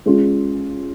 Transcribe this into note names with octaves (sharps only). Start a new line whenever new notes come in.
G#3 C#4 F4